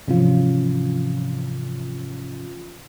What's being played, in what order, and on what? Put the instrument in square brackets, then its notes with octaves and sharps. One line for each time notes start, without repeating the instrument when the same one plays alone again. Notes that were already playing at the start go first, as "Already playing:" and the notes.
[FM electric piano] G#2 C3 E3 F3 C#4 F4